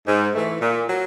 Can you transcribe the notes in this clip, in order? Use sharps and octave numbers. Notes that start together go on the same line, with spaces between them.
G#2
E3 A3
A#2
F#3